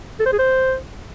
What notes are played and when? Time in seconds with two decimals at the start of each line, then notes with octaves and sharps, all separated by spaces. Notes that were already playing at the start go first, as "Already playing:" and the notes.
0.20 A4
0.26 C5
0.33 G#4
0.39 C5